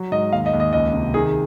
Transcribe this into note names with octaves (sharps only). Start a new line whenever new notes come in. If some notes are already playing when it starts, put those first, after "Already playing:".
Already playing: F#3
G#2 D#5
D#2 F5
D#5
D#2
D#5
C#2 D#5
C3
D#3 G#4